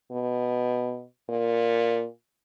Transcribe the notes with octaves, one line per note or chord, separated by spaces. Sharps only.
B2
A#2